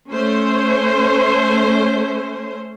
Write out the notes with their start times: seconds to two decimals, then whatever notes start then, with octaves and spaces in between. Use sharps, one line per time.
0.12 A3 C#4 C5